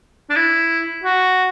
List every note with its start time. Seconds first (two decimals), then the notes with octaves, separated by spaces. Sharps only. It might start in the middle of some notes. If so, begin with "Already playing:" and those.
0.30 D4
0.36 E4
1.03 F#4